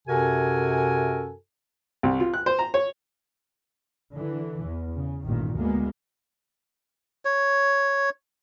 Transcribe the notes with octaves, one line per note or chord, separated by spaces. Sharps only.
F#2 C3 F#4 A4 A#4 G#5
C2
F4
F#6
C5
A#5
C#5
D3 E3
E2
C#3
A1 G2 A#2 D#3
D2 G#3 A#3 B3
C#5